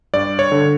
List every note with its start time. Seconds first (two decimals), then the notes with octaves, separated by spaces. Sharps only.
0.14 G2 D5
0.39 C#5
0.52 D3